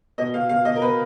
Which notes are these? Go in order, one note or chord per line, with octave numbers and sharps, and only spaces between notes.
B2 D#5
B2 F5
B2 F5
B2 D#5
A#4
B2 B4